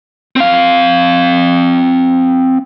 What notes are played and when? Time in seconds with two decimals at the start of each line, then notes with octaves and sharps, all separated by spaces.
0.36 C4 F5